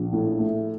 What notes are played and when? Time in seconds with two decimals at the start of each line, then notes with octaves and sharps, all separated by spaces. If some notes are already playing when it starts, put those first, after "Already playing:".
Already playing: A#1
0.13 A2
0.39 A3